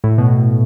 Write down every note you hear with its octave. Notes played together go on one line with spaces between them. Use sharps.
A2
B2